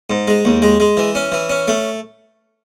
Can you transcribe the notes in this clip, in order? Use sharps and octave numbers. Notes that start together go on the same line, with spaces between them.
G#2
G#3
D#2
G#3
G#3
E3
C#4
E3
C#4
A3